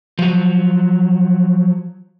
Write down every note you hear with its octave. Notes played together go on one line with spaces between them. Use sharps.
F3 F#3